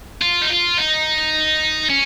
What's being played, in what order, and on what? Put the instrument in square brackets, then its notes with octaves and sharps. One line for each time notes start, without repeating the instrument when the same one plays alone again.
[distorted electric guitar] F4
D#4
F4
D#4
C#4